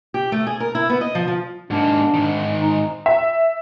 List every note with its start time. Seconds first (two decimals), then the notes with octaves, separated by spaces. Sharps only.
0.14 G4
0.32 A3
0.47 G#4
0.60 A#4
0.75 E4
0.90 B3
1.01 D#5
1.15 F3
1.28 F3
1.71 G#2 A#3 D4
2.14 G#2 D#3
2.59 D#4
3.06 E5